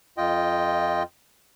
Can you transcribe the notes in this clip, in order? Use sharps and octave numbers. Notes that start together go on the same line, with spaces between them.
F2 F4 D#5 G5